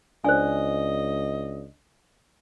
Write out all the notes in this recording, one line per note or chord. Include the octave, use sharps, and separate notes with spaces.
C#2 D4 C5 D5 D#5 G#5